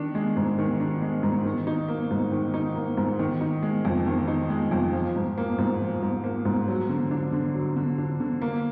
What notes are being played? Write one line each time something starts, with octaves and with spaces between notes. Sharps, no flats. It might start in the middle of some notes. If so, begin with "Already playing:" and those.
Already playing: D#3 D4
G#3
G#2
D#3
D4
G#3
G#2
D#3
D#4
A#3
G#2
D#3
D#4
A#3
G#2
D#3
D#4
G#3
F2
D#3
D#4
G#3
F2
F3
G#2
A#3
G#2
F3
G#2
A#3
G#2
F#3
D3
D4
D3
F#3
D3
D4
D3
A#3